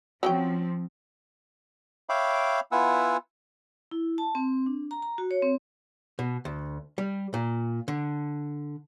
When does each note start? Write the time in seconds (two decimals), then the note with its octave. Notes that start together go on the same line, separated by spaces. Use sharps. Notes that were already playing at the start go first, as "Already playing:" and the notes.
0.23 F3 F#3 C4 C#4 G5
2.09 C#5 E5 F5 G5 B5 D6
2.72 B3 E4 F4 F#5 G#5 E6
3.91 E4
4.18 A5
4.35 C4
4.66 D4
4.91 A#5
5.02 A#5
5.18 F#4
5.31 C#5
5.42 C4
6.19 B2
6.45 D2
6.98 G3
7.34 A#2
7.88 D3